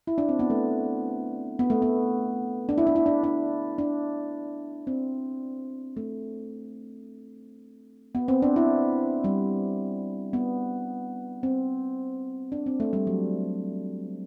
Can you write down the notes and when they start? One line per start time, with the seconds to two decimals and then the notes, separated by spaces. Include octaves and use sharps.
0.07 E4
0.18 D4
0.29 C4
0.39 B3
0.50 A3
1.59 B3
1.70 A3
1.82 B3
2.69 D4
2.78 E4
2.87 D4
2.96 E4
3.06 D4
3.24 D4
3.79 D4
4.87 C4
5.97 A3
8.15 B3
8.28 C4
8.42 D4
8.56 E4
9.24 G3
10.33 B3
11.43 C4
12.52 D4
12.66 C4
12.80 A3
12.93 G3
13.07 F#3